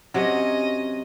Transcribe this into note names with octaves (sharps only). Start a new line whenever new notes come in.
C3 F#3 C#4 D#5